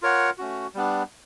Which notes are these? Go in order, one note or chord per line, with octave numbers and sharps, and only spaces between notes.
F4 A#4 C#5 F#5
A3 C#4 F#4
G3 B3 D4